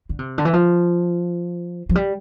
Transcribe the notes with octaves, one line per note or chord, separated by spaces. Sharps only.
D3
C3
D3
E3
F3
F3
G3